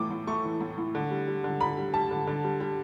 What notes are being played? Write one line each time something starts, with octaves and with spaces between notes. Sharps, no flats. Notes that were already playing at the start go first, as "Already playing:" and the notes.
Already playing: A2 E3 A3 D6
A2
A3 C#6
E3
A2
A2
D3
G3
G3
D3
D3 B5
G3
G3 A5
D3
D3
G3
G3